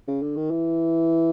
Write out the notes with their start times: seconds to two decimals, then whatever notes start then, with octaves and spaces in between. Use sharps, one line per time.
0.08 C#3
0.22 D3
0.36 D#3
0.51 E3